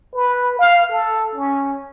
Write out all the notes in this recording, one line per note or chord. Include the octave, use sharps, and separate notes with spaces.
B4
F5
A4
C#4